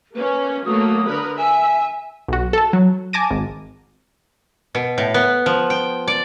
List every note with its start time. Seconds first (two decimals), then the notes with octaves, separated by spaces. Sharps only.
0.15 A#3 C#4 B4
0.65 F#3 A3 A#3 D#6
1.07 D3 A#4 B4
1.37 E5 G#5
2.28 B1 F#4
2.53 A4 A5
2.73 F#3
3.13 G#5 A5 D6 A#6 D#7
3.31 G#1
4.75 B2
4.98 A2
5.14 B3
5.46 F3
5.70 G5
6.07 D5